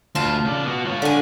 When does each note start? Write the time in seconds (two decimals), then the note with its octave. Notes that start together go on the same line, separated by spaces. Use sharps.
0.15 D2 F4 A5
0.45 C#3 D5
0.65 B3 F#4
0.85 F4 C#5
1.02 D3 G#5